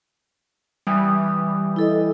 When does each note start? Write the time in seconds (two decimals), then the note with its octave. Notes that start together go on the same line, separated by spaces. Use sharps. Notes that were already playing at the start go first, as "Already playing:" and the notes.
0.87 E3 G3 D#6
1.76 E4 A4 D#5